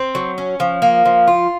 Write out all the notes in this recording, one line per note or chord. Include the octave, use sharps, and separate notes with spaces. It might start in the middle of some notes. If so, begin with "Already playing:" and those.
Already playing: C4
F#3
C#4
F3
A#3
F3
F4